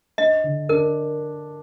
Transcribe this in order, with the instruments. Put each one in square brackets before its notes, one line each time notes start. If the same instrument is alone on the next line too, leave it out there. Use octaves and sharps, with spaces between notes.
[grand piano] D4 [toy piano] D#5
[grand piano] D3
[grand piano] D4 [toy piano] A#4